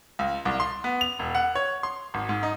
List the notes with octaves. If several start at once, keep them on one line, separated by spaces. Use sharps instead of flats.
C#2
C2
C6
B3
F7
E1
F#5
C#5
C6
G#1
G#2
D#4